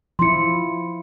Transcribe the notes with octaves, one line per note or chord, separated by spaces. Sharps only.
F3 E4 C6 C#7